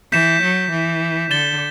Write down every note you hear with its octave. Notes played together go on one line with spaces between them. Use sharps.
E3 G6 B6 E7
F#3
E3
D3 A6 E7 G7